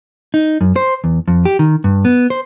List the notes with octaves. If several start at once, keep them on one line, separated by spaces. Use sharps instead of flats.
D#4
F#2
C5
E2
F2
G4
D#3
G2
B3
C5